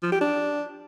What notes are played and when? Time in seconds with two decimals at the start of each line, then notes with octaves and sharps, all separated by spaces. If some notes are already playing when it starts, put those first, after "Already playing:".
0.03 F3
0.12 G4
0.21 D4